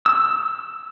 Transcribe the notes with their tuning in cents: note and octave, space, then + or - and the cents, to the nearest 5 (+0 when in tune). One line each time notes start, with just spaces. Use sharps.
E6 +10